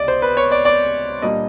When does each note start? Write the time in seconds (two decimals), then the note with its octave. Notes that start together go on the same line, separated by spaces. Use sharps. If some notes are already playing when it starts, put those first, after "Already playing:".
Already playing: C#2 C3 D5 D#5
0.08 C5
0.22 B4
0.37 C#5
0.51 D5
0.65 D5
1.22 A#2 G3 A#3 D4 D#5